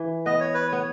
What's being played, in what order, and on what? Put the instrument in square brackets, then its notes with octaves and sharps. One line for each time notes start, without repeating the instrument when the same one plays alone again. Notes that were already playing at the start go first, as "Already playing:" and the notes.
Already playing: [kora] E3
[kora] B3 [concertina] D#5
[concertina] C#5
B4
[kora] B3 [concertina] C#5